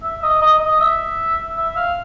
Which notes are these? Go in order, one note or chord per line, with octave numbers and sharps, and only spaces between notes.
E5
D#5
D#5
D#5
E5
E5
F5